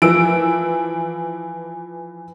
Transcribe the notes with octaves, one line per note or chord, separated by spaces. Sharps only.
E3 F3 E6 D7